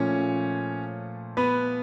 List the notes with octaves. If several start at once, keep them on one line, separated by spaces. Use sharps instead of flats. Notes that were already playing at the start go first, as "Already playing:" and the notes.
Already playing: A#2 F3 A3 C#4 C#5
B3 B4